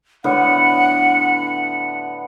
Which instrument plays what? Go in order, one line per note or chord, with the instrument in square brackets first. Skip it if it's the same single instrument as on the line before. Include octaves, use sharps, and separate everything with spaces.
[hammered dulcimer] A2 D3 B3 [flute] F#5